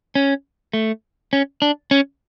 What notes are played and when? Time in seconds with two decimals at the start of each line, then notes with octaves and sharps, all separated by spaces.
0.15 C#4
0.73 A3
1.33 C#4
1.62 D4
1.91 C#4